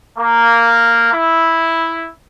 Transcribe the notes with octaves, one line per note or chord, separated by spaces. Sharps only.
A#3
E4